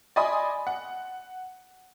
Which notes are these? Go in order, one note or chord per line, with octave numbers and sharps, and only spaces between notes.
D5 D#5 G#5 B5 C6 D#6
F#5